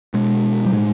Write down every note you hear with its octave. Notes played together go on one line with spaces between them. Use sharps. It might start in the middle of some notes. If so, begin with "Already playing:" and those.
B2 G#3
G3
A2 G#3